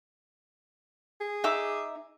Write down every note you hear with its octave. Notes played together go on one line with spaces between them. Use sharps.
G#4
D#4 E5 D6